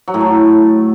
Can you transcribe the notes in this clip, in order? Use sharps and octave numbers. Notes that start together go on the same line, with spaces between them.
F#3
A2
A3